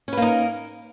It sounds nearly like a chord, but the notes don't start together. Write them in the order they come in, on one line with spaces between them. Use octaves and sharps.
C#4 B4 A#3 D#4 A#4